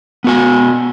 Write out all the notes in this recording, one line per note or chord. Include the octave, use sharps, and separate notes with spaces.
B3 F#4 G#5